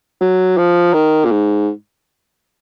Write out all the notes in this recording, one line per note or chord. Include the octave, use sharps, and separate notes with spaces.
F#3
F3
D#3
A#2
G#2